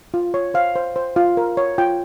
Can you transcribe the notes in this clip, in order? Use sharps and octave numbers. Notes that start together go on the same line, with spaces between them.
F4
C#5
C5 F5
C5
C5
F4 F5
A#4
C#5
F4 G5